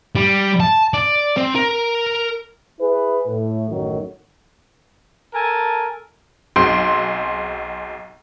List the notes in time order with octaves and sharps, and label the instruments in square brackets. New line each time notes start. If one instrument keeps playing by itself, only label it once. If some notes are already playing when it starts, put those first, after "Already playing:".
[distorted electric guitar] G3
A5
D5
C4
A#4
[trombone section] E4 G#4 B4
A2
A1 F#2 A2 D#3 F#3
[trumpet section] A4 A#4 G#5 A5
[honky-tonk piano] B1 C4 F#4 G#4 C6 D7